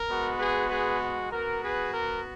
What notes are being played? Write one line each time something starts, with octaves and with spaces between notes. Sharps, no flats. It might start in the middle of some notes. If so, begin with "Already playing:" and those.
Already playing: A#4
G#3 B3 F#4
G#4 B4
G#4 B4
B3 F#4 A#4
G#4 B4
A#4